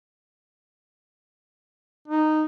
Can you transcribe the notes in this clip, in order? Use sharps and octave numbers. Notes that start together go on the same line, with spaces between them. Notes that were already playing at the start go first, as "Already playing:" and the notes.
D#4